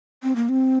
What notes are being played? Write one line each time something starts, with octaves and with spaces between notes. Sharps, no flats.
C4
A#3
C4